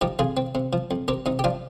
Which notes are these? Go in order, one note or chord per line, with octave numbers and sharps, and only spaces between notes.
F3 D#4 G4
F2 F4 G#4
C4
C3
F3
F2
C4 G4 A#4
C3 D#4
G4
F3 D4 F4